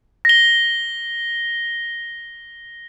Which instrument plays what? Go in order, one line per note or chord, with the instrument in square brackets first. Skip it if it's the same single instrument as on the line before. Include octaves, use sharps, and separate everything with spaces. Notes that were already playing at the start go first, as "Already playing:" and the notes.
[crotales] A#6 G7